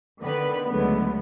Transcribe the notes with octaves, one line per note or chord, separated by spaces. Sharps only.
D3 D#3 B3 B4
C#2 D3 F#3 G#3 A3 B3